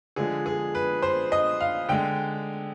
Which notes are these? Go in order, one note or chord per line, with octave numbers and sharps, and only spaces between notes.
D3 F3 G#3 G#4
G#4
B4
C5
D#5
F5
D3 G#3 G5